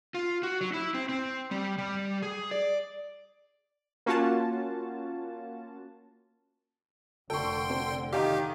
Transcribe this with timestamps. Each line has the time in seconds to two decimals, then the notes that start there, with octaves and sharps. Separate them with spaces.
0.14 F4
0.43 F#4
0.61 F#3
0.74 E4
0.94 C4
1.09 C4
1.51 G3
1.78 G3
2.22 G#4
2.51 D5
4.06 A#3 C#4 F4 F#4 A5
7.30 F1 D3 A4 G5 C6 C#6
7.70 C4 A4
8.13 D#3 G4 F5 G5